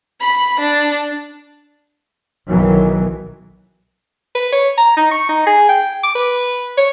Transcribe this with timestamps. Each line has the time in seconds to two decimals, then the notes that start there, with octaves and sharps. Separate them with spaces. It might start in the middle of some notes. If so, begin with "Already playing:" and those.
0.20 B5
0.60 D4
2.49 B1 D#3 E3 F#3
4.35 B4
4.52 C#5
4.77 A#5
4.97 D#4
5.11 C#6
5.29 D#4
5.46 G#4
5.69 G5
6.03 D6
6.15 B4
6.77 C#5